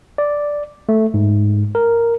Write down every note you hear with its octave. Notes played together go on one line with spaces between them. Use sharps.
D5
A3
G#2
A#4